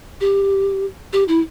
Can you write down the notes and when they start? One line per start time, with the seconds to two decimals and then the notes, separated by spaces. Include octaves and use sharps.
0.21 G4
1.13 G4
1.28 E4